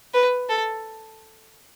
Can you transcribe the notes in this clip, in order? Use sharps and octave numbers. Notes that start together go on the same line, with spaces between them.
B4
A4